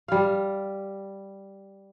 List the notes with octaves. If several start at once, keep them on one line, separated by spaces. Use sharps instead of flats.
G3 F5